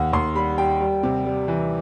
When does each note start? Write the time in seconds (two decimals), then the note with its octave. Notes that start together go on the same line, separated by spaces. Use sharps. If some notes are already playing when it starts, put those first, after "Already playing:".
Already playing: D#2 F#5
0.13 D#2 C6
0.35 G3 B5
0.58 G3 G5
0.80 G3
1.03 C3
1.25 G3
1.48 E3